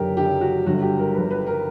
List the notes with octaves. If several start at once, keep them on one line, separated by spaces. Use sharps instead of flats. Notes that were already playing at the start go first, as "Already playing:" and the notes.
Already playing: F#1 F#2 D3 G4 A#4
F#1 F#2 D3 G4
F#4
G1 G2 D3 F#4
G4
A#4
G1 G2 D3 B4
B4
A#4